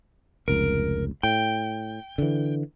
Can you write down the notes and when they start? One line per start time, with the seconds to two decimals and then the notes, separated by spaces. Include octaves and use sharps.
0.48 F1 C#2 A#4
1.23 A2 G5
2.18 D3 E3